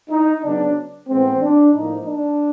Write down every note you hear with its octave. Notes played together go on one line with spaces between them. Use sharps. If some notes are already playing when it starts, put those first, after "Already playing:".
D#4
C#3 F#3 B3 D4
A2 E3 G#3 B3 C4
D4
A2 F3 A#3 D#4
D4